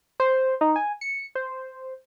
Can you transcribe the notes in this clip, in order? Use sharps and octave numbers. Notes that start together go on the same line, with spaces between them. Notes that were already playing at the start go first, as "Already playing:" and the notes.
C5
D#4
G#5
C#7
C5